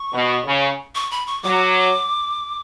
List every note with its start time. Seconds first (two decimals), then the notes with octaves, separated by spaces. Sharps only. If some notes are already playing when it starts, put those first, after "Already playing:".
Already playing: C#6
0.13 B2
0.46 C#3
0.95 C#6
1.11 B5
1.27 C#6
1.43 F#3 D6